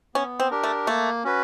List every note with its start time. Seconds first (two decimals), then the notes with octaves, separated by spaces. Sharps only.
0.15 B3 C#4
0.40 C4
0.51 D4 G4 A#4
0.64 A3
0.87 A3 A#3
1.24 C#4 F#4 B4